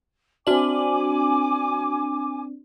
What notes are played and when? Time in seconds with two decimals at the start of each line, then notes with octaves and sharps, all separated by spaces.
0.47 C4 D4 F#4 G#5 D6 F#7